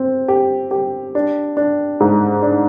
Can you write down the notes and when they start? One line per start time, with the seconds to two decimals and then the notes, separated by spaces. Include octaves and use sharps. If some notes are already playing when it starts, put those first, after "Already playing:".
Already playing: C4
0.28 G4
0.71 G4
1.15 D4
1.57 D4
2.00 G#2
2.42 D4